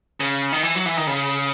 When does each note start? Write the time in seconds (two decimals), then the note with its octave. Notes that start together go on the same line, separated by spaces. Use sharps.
0.20 C#3
0.52 D#3
0.63 E3
0.76 F#3
0.86 E3
0.97 D#3
1.07 C#3